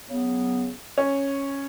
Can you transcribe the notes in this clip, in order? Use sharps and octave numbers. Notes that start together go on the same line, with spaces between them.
C#3 F#3 B3
C#4